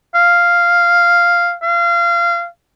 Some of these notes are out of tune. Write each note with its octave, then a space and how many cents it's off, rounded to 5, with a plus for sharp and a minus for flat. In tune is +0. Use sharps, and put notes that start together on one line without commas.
F5 -5
F5 -25